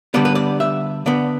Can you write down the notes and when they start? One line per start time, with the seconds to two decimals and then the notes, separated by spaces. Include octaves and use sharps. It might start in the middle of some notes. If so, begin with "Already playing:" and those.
0.14 D3 G3 B3 D5
0.25 B4
0.35 D5
0.60 E5
1.06 D3 B3 D5